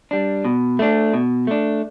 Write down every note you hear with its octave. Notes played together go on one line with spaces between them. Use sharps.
G3 D4
B2
A3 D4
B2
A3 D4